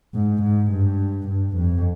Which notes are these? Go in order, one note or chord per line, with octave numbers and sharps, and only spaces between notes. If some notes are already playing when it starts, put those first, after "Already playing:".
G#2
G#2
G2
G2
F2